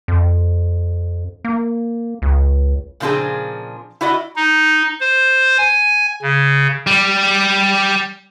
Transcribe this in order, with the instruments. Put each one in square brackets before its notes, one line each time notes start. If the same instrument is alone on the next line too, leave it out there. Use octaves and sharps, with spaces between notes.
[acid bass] F2
A#3
C#2
[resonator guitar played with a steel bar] A#2 C#3 F3 C4 D4 G#4
E4 F#4 D5 D#5
[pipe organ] D#4
C5
G#5
C#3
[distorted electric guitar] G3